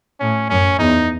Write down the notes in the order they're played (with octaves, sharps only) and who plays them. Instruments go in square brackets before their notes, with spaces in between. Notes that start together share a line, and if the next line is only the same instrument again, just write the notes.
[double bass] A2 [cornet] C#4
[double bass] F#2 [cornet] C#4
[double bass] E2 [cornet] D#4